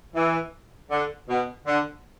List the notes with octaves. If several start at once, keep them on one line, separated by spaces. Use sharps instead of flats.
E3
D3
B2
D3